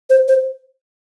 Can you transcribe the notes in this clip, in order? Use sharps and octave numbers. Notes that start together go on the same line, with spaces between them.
C5
C5